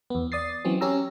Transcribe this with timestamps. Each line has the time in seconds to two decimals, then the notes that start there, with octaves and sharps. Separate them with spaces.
0.10 E2 B3
0.32 D5 D#6 A6 C7
0.65 E3 F#3 C4 C#4
0.81 C#4 G4 A#5 E6